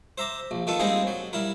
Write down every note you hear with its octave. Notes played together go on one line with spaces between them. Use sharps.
C5 E5 A#5 D6
A#1
D#3 B3 F4 A4
G3 G#3 A#3 C4 D#4 G#4
F#3
G3 E4 A#4